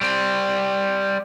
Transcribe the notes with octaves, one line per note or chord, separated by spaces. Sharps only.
G3 C4